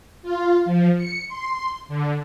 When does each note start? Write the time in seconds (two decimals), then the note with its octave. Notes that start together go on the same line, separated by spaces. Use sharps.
0.23 F4
0.65 F3
0.96 C#7
1.28 C6
1.88 D3